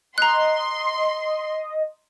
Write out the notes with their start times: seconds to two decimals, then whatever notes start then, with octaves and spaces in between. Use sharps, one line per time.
0.18 D#5 A#5 C6 F#6